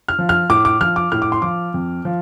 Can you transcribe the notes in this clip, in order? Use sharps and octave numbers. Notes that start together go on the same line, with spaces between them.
F6
F3
F6
A2 D6
D6
F3 F6
D6
A2 F6
D6
C6
F3 D6
F2
F3